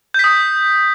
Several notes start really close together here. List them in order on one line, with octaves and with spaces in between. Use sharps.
G6 B6 D#6